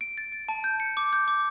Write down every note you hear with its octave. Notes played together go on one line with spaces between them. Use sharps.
D7
A6
D7
A5
G6
C#7
D6
G6
D6